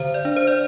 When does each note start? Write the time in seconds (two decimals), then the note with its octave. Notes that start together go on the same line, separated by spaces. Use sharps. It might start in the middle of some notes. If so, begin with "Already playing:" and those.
Already playing: D3 C5
0.14 D5
0.25 D4
0.37 C5
0.47 D5